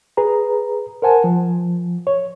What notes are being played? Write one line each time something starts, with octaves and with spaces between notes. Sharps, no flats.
G#4 B4 A#5
A#4 C5 F#5 G#5 A5
F3
C#5